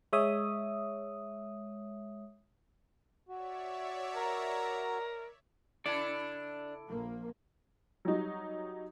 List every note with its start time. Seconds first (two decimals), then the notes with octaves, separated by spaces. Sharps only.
0.13 G#3 C#5 E5 D#6
3.28 F#4 C#5 D5 E5
4.15 A#4 A#5
5.86 C#3 D4 E4 A4 D5
6.89 A#1 F3 A#3
8.05 F#3 G3 D#4 F#4